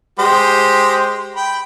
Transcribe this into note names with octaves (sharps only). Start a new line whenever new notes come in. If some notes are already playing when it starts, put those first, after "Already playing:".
G#3 G4 C5
G5 B5